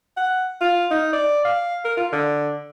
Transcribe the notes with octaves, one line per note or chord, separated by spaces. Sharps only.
F#5
F4
D#4
D5
F5
A#4
F4
D3